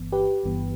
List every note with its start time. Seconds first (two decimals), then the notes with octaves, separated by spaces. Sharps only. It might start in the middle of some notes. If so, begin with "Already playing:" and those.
Already playing: G1 G2 E3 B3
0.12 G4 B4
0.44 G1 G2 E3 B3